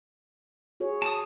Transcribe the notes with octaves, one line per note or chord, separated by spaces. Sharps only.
F#4 G#4 C#5
A5 D#6